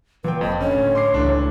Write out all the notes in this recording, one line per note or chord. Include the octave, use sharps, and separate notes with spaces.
A#2 E3 F#3 B4 G5
F1 F2 D#5
D3 C#4 C#5
A2
C6 D6 C7
C#2 E3 A3 D4